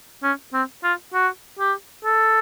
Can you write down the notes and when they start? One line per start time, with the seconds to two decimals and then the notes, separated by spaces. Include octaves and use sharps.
0.23 C#4
0.54 C4
0.84 F4
1.14 F#4
1.59 G4
2.05 A4